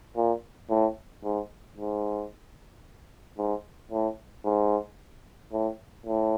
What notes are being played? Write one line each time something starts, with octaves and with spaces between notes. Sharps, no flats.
A#2
A2
G#2
G#2
G#2
A2
G#2
A2
A2